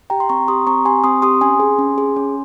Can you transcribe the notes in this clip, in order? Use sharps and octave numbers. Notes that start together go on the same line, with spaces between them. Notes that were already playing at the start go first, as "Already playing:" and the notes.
G4 G5 A#5
C6
C4 A#5 C#6
G4 C6 D#6
C4 A#5 C#6
G4 G#5 C6
C4 C6 D#6
G4 C6 D#6
C#4 G#5 C6
G#4
C#4
G#4
C#4